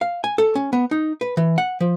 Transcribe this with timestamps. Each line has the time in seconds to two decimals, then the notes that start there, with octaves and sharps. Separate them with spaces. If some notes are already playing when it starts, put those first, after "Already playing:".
0.01 F5
0.24 G#5
0.38 A4
0.55 C#4
0.73 B3
0.91 D#4
1.21 B4
1.37 E3
1.58 F#5
1.81 F3